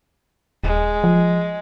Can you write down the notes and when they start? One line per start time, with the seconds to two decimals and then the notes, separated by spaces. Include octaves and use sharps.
0.64 D#1 G#3
1.04 F3